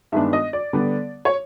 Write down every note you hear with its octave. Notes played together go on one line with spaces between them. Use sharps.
G2 D#3 G#3 B3 D4 E5
D#5
D5
D3 G3 B3
C#5